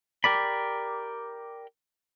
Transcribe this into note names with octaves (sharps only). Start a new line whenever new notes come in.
G4 A#4 D5 B5